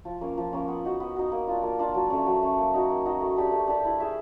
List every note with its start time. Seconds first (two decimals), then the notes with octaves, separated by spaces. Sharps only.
0.05 F3
0.21 A#3 C#4
0.38 F3
0.53 A#3 C#4
0.68 B3
0.85 D#4 F#4
1.00 B3
1.16 D#4 F#4
1.32 A#3
1.47 D4 F4
1.63 A#3
1.79 D4 F4
1.94 F#3
2.10 A3 C#4
2.27 F#3
2.42 A3 C#4
2.58 A#3
2.74 D#4 F#4
2.89 A#3
3.06 D#4 F#4
3.21 A3
3.37 D4 G4 B4
3.52 A3
3.68 D4 G4 B4
3.85 E4
4.00 G#4 C#5 E5